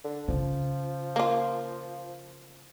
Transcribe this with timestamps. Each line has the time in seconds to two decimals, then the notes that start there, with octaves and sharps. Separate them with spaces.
0.04 D3
0.28 C#3 F3 C#4
1.16 A#3 F4